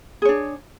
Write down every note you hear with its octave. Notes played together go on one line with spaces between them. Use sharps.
D4 G#4 C#5